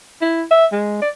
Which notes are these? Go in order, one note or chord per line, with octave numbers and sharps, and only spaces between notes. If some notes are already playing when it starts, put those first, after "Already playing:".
E4
E5
G#3
D5